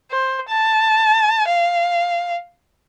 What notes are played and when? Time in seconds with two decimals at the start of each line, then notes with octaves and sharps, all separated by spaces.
0.11 C5
0.49 A5
1.48 F5